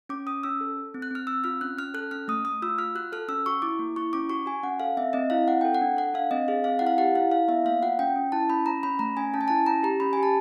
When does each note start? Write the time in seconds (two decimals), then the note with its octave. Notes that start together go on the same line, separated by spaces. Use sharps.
0.09 C#4 D6
0.26 C#4 D#6
0.43 C#4 E6
0.61 A4
0.77 A4
0.94 C4
1.02 F#6
1.11 C4 F6
1.27 C4 E6
1.44 F4 F6
1.61 C#4 F#6
1.78 C#4 F6
1.94 A4 F#6
2.11 C#4 F6
2.28 A3 D#6
2.45 A3 D#6
2.62 F4 E6
2.78 F4 F6
2.95 F#4 F#6
3.12 A4 F6
3.28 C#4 E6
3.46 F#4 C#6
3.62 E4 D6
3.79 A#3
3.96 E4 C#6
4.13 C#4 D6
4.30 F#4 C#6
4.46 F#4 G#5
4.63 C#4 F#5
4.80 A4 F5
4.97 C4 E5
5.13 C4 D#5
5.30 E4 F5
5.48 C4 F#5
5.61 A4 G5
5.74 F#5
5.81 D4
5.97 A4 F#5
6.14 D4 F5
6.31 C4 D#5
6.48 G#4 F5
6.64 C4 F5
6.79 E4 F#5
6.87 F5
6.98 G4 F#5
7.15 E4 F5
7.31 E4 F5
7.48 B3 E5
7.65 A#3 F5
7.82 F4 F#5
7.99 C#4 G5
8.16 C#4
8.32 E4 A5
8.49 C#4 B5
8.66 C#4 A#5
8.83 C#4 B5
8.99 A3 A#5
9.17 C#4 G#5
9.34 C#4 A5
9.41 G#5
9.48 E4 A5
9.66 C#4 A#5
9.83 G4 A#5
10.00 C#4 B5
10.13 G4 G#5
10.23 A5